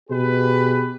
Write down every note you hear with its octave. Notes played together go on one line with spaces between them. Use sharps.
B2 G4 G#4 B4